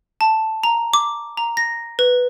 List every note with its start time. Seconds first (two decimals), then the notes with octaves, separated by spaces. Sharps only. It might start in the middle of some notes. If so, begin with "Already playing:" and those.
0.21 A5
0.63 A#5
0.94 D6
1.37 A#5
1.57 A#6
1.99 B4